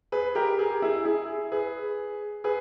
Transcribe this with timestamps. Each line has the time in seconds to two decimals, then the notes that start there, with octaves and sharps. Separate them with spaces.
0.12 G#4 B4
0.35 G4 A#4
0.59 G#4
0.71 G4
0.82 E4 G#4
1.05 E4 G#4
1.52 G#4 B4
2.44 G#4 B4